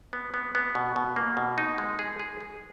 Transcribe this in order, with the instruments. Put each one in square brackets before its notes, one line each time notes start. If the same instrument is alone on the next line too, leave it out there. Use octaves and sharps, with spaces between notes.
[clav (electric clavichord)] B3
B3
B3
B2
B2
A#3
B2
D#4
G#3
G#4
G#4
G#4